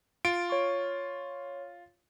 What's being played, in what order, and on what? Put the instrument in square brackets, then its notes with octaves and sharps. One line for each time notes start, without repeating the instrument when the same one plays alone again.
[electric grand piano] F4 D7
[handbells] C#5 C#6